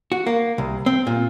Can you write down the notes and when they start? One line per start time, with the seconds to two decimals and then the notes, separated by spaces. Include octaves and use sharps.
0.12 F#4
0.27 A#3
0.58 C2
0.86 C4
1.07 A#2